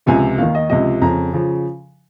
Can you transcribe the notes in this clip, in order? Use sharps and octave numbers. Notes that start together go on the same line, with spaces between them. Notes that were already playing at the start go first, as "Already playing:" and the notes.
C#2 C3 F3 G#5
D#2 D#3 F5
D#5
C#2 C3 F3 D#5
F2 C#3 F3 A#5
C#3 F3